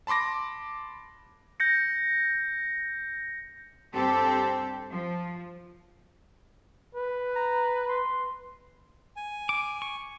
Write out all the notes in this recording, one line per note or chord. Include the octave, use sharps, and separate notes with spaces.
A5 B5 C6 D6 A#6
G6 A#6 C#7
G2 C4 G4 A4
F3
B4
A#5
C6
G#5
D6
C#6